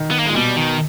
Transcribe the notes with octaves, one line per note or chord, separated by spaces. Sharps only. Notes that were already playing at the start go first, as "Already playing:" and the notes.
Already playing: D#3
B3
A#3
A#2 G#3
B2 G3
D#3